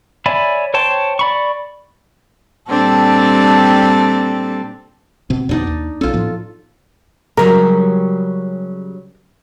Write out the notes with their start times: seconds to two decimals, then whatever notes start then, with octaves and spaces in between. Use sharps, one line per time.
0.26 C#5 D5 E5 G#5 B5
0.74 C5 C#5 G5 A5 C6
1.19 D5 B5 C#6
2.69 A#2 G3 C4 D4 A4
5.30 B2 C4
5.49 E2 B2 B3 D4 D#4 D5
5.67 D#2
6.01 B1 C#4 F4 A4
6.13 A2 F3 B3
7.37 C#3 F#3 G3 A#4